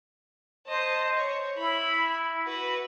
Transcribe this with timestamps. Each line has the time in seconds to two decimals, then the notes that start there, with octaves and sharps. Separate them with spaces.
0.67 C5 D#5 A5
1.18 C#5
1.58 E4 B5
2.46 F#4 B4